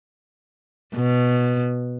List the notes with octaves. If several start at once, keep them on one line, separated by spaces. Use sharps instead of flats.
B2